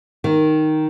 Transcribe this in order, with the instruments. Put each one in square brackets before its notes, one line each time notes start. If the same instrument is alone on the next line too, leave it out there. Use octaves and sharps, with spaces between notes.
[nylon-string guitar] D#3